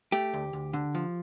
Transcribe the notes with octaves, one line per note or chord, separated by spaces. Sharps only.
A3 G4
D2
D2
D3
F3